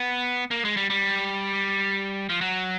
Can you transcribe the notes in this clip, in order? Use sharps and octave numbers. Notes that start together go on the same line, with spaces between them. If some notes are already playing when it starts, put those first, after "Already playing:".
Already playing: B3
A#3
G#3
G3
G3
F3
F#3